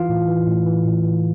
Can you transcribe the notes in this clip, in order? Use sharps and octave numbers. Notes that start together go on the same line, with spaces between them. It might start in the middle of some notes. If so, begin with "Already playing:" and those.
Already playing: E3 F4 F5
A2
E3
A2
E3
A2
E3